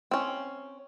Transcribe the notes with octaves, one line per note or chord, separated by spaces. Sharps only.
C4 C#4